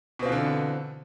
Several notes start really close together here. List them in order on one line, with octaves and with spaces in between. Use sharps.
B2 C4 F4 E3 D3